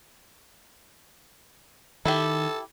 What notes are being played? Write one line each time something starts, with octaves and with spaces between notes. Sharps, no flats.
D#3 E4 G4 A4